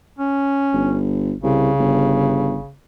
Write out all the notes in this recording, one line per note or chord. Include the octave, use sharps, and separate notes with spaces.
C#4
G1
C2 C#3
G1